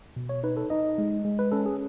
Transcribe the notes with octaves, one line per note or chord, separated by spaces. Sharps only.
B2
C#5
D#4 B4
A4
D#4 D#5
G#3
G#3
B4
C#4 A4
G#4